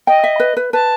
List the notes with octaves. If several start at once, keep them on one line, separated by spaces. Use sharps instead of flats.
D#5 G5
E5
B4
B4
B4 A5